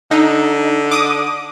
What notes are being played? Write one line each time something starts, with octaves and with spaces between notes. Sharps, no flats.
D3 D#4
D6 D#6